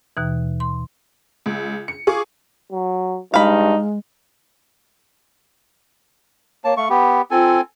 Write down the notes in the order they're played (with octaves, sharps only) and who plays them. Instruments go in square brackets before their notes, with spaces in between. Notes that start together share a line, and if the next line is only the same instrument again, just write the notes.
[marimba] D#2 B2 E3
C6
[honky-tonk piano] C#2
C#7
F4 G#4 C#6 D6
[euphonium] F#3
[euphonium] G2 [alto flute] G#3 [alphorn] D#4 [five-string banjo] F5 B5
[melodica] A#3 A5 [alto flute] C#5
[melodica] A3 C#6 [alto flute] F5
[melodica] B3 G4 [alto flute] B5
[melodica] C4 A4 G#5 [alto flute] F4